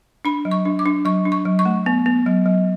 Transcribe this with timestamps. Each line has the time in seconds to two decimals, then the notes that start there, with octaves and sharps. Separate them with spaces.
0.25 D4 B5
0.45 F#3
0.51 C#6
0.65 D4
0.79 D6
0.86 D4
1.05 F#3 C#6
1.25 D4
1.32 C#6
1.45 F#3
1.59 C#6
1.65 A3
1.86 B3
2.06 B3
2.26 F#3
2.46 F#3